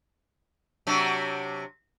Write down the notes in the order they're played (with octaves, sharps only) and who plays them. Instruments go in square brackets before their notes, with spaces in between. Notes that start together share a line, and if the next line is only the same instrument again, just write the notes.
[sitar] C3 F#3 D4